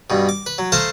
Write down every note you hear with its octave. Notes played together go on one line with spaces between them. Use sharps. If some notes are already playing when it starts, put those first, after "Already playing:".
G2 B2
D6
B4
F#3
A3 C5 F5 A5 A#5 C6